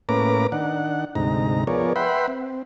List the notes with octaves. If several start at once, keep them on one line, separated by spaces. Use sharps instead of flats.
A2 A#3 C#4 B4 A#5 D6
D#3 D4 F#5
D2 G#2 C3 D#4 A#5
F3 B3 G#4 A#4 C#5 D5
B4 E5 F#5 G5 B5 C6
C4